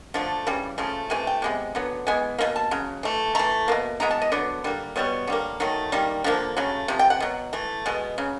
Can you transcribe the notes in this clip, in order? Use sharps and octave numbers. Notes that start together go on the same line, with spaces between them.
D3 F3 A3
C#3 E3 G3
C#3 F3 A3
C3 E3 A3 G#5
G5
C3 E3 G#3 B3
D3 F#3 B3
E3 G#3 B3 G#5
B2 G3 A#3
A5
C#3 F#3
E3 A3
E3 A3 A#5
B2 F#3 A#3
E3 G#3 B3 A#5
A5
D#5
D3 F#3 B3 D5
D3 G3 A#3
B2 G3 B3 C#5
D3 G3 A#3
D#3 F#3 A3
D#3 G3 A#3
D3 F3 A#3
C#3 F#3 A3
C3 F3
G5
F#5
B2 F#3
E3 A3
B2 G#3 B3
C#3 F#3